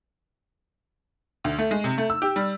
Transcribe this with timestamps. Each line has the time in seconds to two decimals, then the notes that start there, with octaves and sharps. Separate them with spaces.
1.44 D2
1.59 A3
1.71 G#3
1.84 C3
1.98 A3
2.10 E6
2.22 G4
2.36 G3